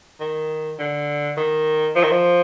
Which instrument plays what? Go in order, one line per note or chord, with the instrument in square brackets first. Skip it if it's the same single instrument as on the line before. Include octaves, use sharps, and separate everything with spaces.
[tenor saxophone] D#3
D3
D#3
F3
D#3
F3